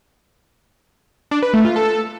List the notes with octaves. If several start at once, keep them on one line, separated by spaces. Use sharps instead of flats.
D4
B4
A3
F4
A4